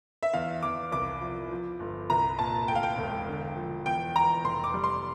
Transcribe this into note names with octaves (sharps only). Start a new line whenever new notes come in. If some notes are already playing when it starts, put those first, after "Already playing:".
E5
E2 F5
E2 D6
C2 D6
F3
F3
G1
C2 A#5
A#2 A5
D2 G5
F5
G5
E1
D3
F3
E2 G5
E2 A#5
F1 C6
D6
G3
C6